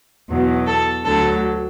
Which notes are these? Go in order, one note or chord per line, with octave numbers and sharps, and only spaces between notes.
E2 B2 F#3
A4
D2 D3 F#3 A4